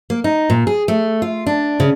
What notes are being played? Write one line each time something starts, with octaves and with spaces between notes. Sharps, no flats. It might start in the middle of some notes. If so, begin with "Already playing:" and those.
A#3
D#4
A#2
G#4
A3
F4
D4
C#3